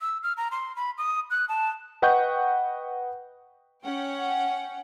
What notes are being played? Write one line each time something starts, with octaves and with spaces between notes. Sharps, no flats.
E6
F6
A#5
C6
B5
D#6
F#6
A5
B4 D#5 F#5 G5 C#6 G6
C#4 F#5 G5